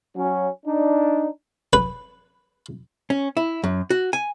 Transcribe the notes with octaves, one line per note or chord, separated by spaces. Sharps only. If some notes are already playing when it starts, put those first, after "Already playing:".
F#3 C#4
D4 D#4
B4
C#4
E4
F#2
F#4
G#5